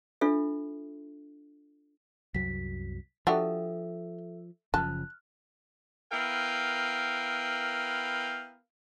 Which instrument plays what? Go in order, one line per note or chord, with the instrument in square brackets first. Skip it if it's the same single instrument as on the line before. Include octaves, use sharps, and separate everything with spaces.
[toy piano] D4 F4 A4 E5
[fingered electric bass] C2 F#2 F#3 [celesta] B6
[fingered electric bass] F3 [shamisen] D4 F#4 G4 [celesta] A4 E5 E6
[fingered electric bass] F#1 C#3 F3 [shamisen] A5 [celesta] F6 F#6
[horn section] B3 E4 A#4 F5 G5